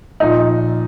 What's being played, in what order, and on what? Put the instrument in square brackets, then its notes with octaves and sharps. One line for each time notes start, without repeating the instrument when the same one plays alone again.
[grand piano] A#2 F3 D#4